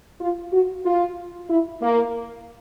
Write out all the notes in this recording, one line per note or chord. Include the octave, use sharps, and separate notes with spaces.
F4
F#4
F4
E4
A#3